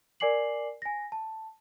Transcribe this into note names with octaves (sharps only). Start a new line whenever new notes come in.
A#4 D5 G#5 D6 C7 F#7
G#5 A#6
A5